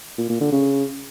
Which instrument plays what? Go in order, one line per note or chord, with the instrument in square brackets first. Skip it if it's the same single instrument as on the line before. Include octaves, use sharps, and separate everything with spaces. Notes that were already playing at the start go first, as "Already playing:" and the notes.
[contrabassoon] A#2
A#2
D3
C#3